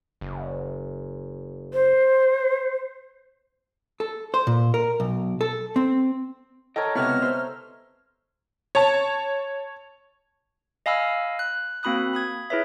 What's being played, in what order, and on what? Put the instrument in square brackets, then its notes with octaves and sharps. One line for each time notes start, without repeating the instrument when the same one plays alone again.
[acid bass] F#1
[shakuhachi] C5
[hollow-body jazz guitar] A4
C5
A#2
A#4
B1
A4
C4
[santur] A4 A#4 C#5 [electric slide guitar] D#5 G5
[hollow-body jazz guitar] C#2 C3 E4 [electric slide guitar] B3 B4 D#5 [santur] C#6 [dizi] F6
[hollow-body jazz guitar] C5 [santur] E5
[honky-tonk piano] C#5 A5
[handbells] D#5 F5 G#5 B5 E6 F6
F#6
A#3 C4 F#4 B5 D#6 F#6
B5 D#6 G#6
E4 G#4 B4 C#5 E5